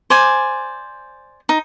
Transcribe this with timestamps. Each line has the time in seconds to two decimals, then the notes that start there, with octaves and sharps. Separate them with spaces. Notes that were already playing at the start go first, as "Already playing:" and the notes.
0.10 C5 D5 G#5
1.49 D#4